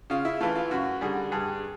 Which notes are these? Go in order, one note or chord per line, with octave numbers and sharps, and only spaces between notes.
C#3 F4
E4
E3 A3 F4
F4
F#2 F#4
D3 G3 G#4
G2 G#4